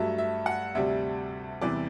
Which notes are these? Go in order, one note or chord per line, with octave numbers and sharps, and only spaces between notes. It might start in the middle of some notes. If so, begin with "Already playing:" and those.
Already playing: G2 F#3 A3 E5
E5
F#5
D2 C3 G3 E5
E2 C3 E3 G3 D5